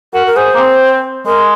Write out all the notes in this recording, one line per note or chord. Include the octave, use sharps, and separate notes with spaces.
F#4 A#4
A#4
G#4 C5
A#3
C4
G#3 A#4